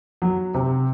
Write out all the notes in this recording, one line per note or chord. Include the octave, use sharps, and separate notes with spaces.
F#3
C3